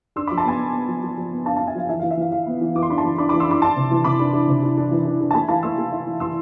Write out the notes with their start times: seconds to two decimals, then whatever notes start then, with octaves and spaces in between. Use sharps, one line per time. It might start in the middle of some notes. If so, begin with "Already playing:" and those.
0.16 D4 C6 E6
0.27 B5 D6
0.31 F3
0.38 A5 C6
0.45 B3 G#5 B5
0.59 B3
0.74 B3
0.88 F3
1.03 F3
1.17 F3
1.32 B3
1.45 D4 F5 A5
1.56 F5 A5
1.61 D4
1.67 E5 G#5
1.75 F3 F5
1.89 E3 E5
2.00 F5
2.03 E3
2.11 E5
2.17 E3 F5
2.32 E3 F5
2.46 B3
2.61 E3
2.75 E3 D6
2.83 C6
2.89 D4 B5
2.98 A5 C6
3.04 E3
3.18 D4 B5 D6
3.29 B5 D6
3.33 E3
3.40 C6 E6
3.47 D4 B5 D6
3.62 D4 A5 C6
3.76 C3
3.91 E3
4.04 C3 B5 D6
4.19 D4
4.33 D4
4.48 C3
4.63 D4
4.77 D4
4.91 E3
5.06 D4
5.20 D4
5.31 A5
5.34 A3 G#5 B5
5.48 E3 F5 A5
5.63 A3 C6 E6
5.78 A3
5.92 E4
6.07 E3
6.20 E3 C6 E6